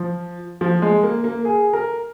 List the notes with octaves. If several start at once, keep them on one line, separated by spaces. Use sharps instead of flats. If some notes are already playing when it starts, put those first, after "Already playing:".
Already playing: F3
F3
G#3
A#3
A#3
G#4
A#4